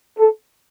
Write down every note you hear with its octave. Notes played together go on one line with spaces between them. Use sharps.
A4